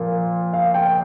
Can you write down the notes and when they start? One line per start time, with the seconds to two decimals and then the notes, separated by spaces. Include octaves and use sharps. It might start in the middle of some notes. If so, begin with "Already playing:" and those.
Already playing: A#2 F3
0.53 F5
0.74 G5